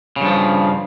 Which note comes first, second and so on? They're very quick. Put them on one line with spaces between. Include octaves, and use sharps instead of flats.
C#3 G2 F3